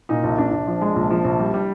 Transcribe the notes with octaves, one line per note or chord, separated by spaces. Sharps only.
A#2 D#4
A#1
A#1 D4
A#1
F3
G#3
A#1
F3
A#1
G3
G3